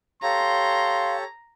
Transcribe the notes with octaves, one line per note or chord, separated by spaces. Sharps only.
G4 A4 C#5 F5 A#5 C6